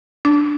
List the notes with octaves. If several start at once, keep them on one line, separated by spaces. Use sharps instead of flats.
D4